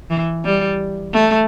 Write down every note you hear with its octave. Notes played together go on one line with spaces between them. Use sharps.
E3
G3
A3